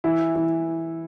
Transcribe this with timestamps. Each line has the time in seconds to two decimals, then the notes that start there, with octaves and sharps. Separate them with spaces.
0.04 E3 E4
0.35 E3 E4